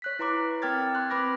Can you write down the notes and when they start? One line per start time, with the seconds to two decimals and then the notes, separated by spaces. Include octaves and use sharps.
0.02 C#5 F#6 B6
0.19 E4 B4 A#5 C6 D6
0.62 C4 A#4 G5 F6 G#6 A6
0.95 C6 F#6
1.10 C4 B4 B5 D6 A#6